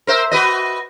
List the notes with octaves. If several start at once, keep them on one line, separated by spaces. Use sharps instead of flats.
A#4 C5 E5
F#4 B4 D#5